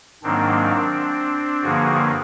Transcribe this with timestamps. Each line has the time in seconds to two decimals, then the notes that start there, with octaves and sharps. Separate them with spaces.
0.23 G#2 D#3 F#3 A#3 C4 D4
1.62 G2 D3 F3 A#3 F#4 G#4